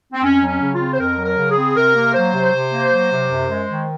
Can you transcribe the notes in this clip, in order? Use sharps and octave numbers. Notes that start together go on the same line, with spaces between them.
C4
F2 C#4
F#3
C#4
C#3
F4
C4
C5
F2 A#4
F#3
A#4
C#3
G#4
C4
C3 A#4
A#3
F#3 C5
C3
C3
A#3
F#3
C3
F#2
G#3
D#3